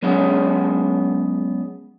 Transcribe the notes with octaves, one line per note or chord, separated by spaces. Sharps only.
F#3 G#3 B3 C#4 G#4